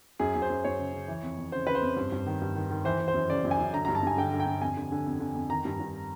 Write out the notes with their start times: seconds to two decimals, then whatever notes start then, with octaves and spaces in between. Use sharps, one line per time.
0.19 F#2 G#4
0.35 F#2
0.42 C5
0.50 F#2
0.64 F#2 C#5
0.79 C#3
0.93 C#3
1.08 E3
1.23 F2
1.38 F2
1.52 C#3 C5
1.67 C#3 B4
1.75 C5
1.82 F2
1.96 G2
2.12 G2
2.26 D#3
2.42 G2
2.56 D#3
2.70 D#3
2.85 E3 C5
3.00 E3
3.08 C5
3.14 F#2
3.30 C#3 D5
3.44 F#2
3.51 G#5
3.59 F#2
3.73 D3 A#5
3.85 A#5
3.88 G2
3.95 A5
4.03 G2 G#5
4.17 D3 G5
4.33 D3
4.40 G5
4.46 D3
4.61 F2 G#5
4.77 D3
4.92 D3
5.06 F2
5.20 D3
5.35 F2
5.50 D#3 A#5
5.65 G2
5.80 G2